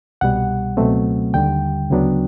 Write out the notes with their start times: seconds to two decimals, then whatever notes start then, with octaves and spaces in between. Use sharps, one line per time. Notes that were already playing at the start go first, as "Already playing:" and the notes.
0.21 C2 B2 G3 F#5
0.77 C#2 B2 F#3 A3 C4
1.34 D#2 D3 G3 G5
1.90 D2 C#3 F#3 B3 D4